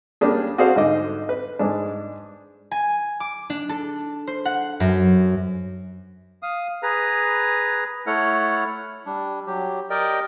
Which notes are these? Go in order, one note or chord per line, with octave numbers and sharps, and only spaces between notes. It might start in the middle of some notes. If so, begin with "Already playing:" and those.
G3 A#3 C#4 D4 G#4
F#4 G#4 A4 C5 D5 F5
G#2 D3 D#4 D#5 D6
B4
G#2 G#3 D4
G#5
D6
D4
A4
C5
F#5
F#2
F5 D#6
G#4 B4 A#5
A3 E4 A4 C#5 F#5 F6
G3 D4
F#3 G4
G4 A#4 D5 D#5 G5